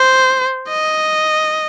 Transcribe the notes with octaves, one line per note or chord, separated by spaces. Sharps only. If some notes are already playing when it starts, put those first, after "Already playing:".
Already playing: C5
D#5